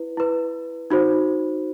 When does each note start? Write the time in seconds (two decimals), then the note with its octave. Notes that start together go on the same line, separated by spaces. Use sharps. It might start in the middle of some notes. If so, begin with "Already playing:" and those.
Already playing: E4 B4
0.17 E4 B4
0.90 D#4 F#4 C5